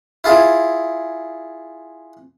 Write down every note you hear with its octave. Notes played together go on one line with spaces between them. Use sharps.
E4 F4 G#4